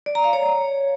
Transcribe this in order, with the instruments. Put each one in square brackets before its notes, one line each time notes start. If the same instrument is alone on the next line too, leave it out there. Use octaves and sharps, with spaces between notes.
[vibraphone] D5
A#5
F5
C#5